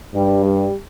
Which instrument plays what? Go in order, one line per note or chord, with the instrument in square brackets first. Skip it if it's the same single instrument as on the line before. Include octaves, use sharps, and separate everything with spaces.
[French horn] G2 [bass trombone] G3
[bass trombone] G3